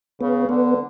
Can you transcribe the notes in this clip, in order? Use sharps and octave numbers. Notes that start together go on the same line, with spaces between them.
C#3 B3
D3 B3